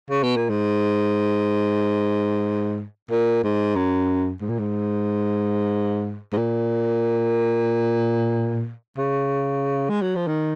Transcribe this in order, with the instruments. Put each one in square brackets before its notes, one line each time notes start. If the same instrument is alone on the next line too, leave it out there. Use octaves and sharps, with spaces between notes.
[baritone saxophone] C#3
B2
A#2
G#2
A#2
G#2
F#2
G#2
A#2
G#2
G#2
A#2
C#3
G#3
F#3
F3
D#3